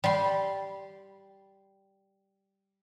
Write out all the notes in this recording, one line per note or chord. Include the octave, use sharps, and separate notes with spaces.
G3 C6